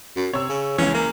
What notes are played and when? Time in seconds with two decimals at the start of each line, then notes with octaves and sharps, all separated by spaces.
0.16 F#2
0.33 C3 C#5 E6
0.49 C#3
0.78 C#2 E3 C#4
0.95 A#3